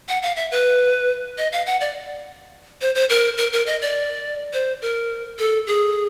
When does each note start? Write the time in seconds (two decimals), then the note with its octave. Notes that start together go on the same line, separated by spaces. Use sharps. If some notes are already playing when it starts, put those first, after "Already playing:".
0.09 F#5
0.22 F5
0.36 E5
0.51 B4
1.38 D#5
1.52 F5
1.66 F#5
1.81 D5
2.81 C5
2.95 C5
3.09 A#4
3.38 A#4
3.53 A#4
3.67 D#5
3.82 D5
4.53 C5
4.82 A#4
5.39 A4
5.67 G#4